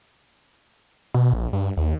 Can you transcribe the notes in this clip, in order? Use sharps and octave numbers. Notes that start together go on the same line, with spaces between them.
B2
A#1
G2
D#2